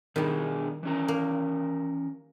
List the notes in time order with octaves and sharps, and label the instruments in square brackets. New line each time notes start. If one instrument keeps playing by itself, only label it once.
[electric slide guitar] B2 D4 G#4 [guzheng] D#3 G3
[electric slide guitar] E3 C#4 A#4
[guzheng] A#3